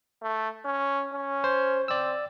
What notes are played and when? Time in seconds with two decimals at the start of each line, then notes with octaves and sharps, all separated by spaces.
0.22 A3
0.65 C#4
1.13 C#4
1.44 C5
1.88 C4 D5 E6